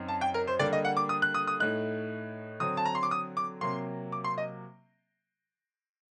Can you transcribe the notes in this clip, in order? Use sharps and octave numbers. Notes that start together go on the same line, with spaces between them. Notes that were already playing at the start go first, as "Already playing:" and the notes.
Already playing: F#2 F#3 C4 D#4
A5
G5
A#4
C5
D3 G3 A#3 D4 D5
D#5
F#5
D6
D#6
F#6
D#6
D#6
A2 A3 D#4 F#6
D3 F#3 C4 D#6
A5
A#5
C6
D6
D#6
D6
C3 F#3 A#3 C6
D6
C6
D#5